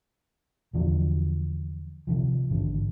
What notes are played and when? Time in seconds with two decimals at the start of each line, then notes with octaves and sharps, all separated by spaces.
0.73 E2 D3 F3 F#3
2.07 C3 D#3 F3
2.50 A1 G#2 D3 D#3